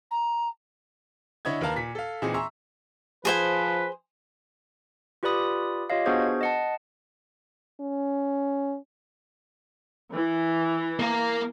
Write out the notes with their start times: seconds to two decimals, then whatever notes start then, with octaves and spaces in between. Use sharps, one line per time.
0.11 A#5
1.45 D3 E4 C#5 D#5 G#6
1.61 D#2 A#4 B4 F5 A5 A#5
1.76 A#2 B6
1.95 A4 F5
2.22 A#2 E3 C4 D#4 G#4
2.34 E5 A#5 C6 C#6 E6
3.25 F3 G#4 B4 C5 G#5
5.23 F4 G4 B4 D5 B5 D#6
5.90 F4 G4 C#5 D#5 F5
6.06 B3 D4 F#4 G#4 C5 G#6
6.41 D#5 F#5 A5
7.81 C#4
10.13 E3
10.99 A#3 A#4